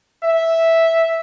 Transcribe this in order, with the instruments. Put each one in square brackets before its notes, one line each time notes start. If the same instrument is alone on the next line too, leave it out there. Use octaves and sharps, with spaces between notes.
[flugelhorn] E5